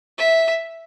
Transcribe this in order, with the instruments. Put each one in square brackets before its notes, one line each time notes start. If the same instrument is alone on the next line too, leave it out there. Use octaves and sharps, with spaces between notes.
[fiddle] E5